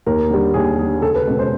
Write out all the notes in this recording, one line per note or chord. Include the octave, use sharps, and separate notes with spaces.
D#2 A#4
D3 G3
D#2 G#4
D3 G3 G#4
C#2 A4
B4
B2 G#3 C#4
C5